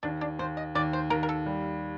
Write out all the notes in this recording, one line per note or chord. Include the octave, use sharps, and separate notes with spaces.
D#2 D4
D4
D#2 C5
D#5
D#2 D5
C5
D#2 A#4
A#4
A4
G3